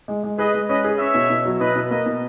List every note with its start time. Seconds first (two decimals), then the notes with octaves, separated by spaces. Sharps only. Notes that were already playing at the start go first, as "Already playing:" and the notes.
0.08 G#3
0.23 G#3
0.38 G#4 B4 D#5
0.54 G#3
0.69 C#4 B4 D#5
0.84 G#4
0.99 C#4 C#5 E5
1.14 B2
1.30 B2
1.46 F#3
1.60 B2 B4 D#5
1.76 B2
1.90 A#3 B4 D#5
2.06 B2